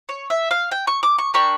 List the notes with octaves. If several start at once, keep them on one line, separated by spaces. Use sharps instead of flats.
C#5
E5
F5
G5
C#6
D6
C#6
A#3 D4 G4 C#6